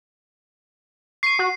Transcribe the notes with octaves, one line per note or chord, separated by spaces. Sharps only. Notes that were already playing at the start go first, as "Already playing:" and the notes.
C#6 C7 D#7
F#4